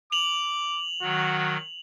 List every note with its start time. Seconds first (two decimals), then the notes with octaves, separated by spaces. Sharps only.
0.12 D6 F7 F#7
1.02 D#3 F#3 F#4